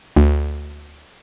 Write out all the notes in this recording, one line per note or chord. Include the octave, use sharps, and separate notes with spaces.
D2